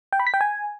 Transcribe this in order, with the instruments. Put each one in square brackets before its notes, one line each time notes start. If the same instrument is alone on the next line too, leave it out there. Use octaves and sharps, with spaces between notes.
[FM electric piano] G5
B5
B6
G5
G#5